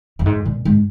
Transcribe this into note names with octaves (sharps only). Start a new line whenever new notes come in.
F#2
G#2
A#2
G#2